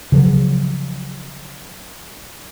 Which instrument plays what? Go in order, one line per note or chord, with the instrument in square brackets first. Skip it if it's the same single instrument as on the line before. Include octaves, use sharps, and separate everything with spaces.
[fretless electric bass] C#3 F3 F#3